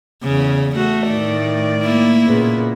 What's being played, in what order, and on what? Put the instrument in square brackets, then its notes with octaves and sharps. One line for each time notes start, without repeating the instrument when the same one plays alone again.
[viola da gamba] E2 C#3
[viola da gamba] A3 [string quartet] F#4
[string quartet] A2 D#3 D5
[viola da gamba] A#3 E4
[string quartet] A#2 C#3 B3